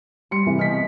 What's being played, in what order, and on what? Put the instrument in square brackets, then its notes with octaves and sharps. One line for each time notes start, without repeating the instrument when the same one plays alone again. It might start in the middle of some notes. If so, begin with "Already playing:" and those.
[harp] G3 [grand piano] C6 C#7
[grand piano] C3 E3
[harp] B2 F6 [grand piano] D#5 B6